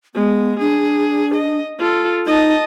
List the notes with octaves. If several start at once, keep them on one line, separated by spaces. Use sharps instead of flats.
G#3 B3
D4 G#4
D#5
F4 A4
D#4 D#5 A5